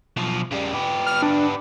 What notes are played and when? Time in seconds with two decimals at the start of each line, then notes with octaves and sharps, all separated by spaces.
0.17 B1 F3
0.52 C#3 G3
0.74 B3 G4
1.06 F6
1.22 D4